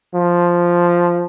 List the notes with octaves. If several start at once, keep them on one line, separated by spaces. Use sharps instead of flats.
F3